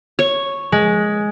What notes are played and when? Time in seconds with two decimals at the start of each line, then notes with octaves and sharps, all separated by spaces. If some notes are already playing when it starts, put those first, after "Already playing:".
0.19 C#5
0.72 G#3